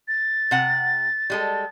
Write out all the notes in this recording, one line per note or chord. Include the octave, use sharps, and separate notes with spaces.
A6
C3 F#5
G3 G#3 A4